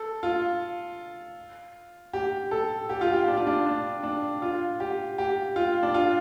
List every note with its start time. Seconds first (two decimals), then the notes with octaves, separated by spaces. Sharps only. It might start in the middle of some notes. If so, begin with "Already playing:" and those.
Already playing: A4
0.23 F4
2.14 G4
2.51 A4
2.89 G4
3.01 F4
3.12 G4
3.28 D4
3.37 F4
3.47 D4
3.66 D4
4.03 D4
4.42 F4
4.80 G4
5.18 G4
5.56 F4
5.83 D4
5.94 F4